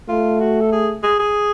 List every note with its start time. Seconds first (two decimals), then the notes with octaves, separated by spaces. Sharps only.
0.08 A3 F4
0.40 F#4
0.61 A4
0.72 G#4
1.03 G#4
1.19 G#4